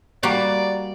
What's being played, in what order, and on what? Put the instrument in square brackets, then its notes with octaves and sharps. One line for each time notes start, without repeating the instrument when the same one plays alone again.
[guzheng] G3 A#3 F#4 [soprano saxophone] D5